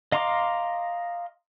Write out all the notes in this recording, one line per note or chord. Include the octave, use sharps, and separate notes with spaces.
D#5 F5 A#5 C6 D6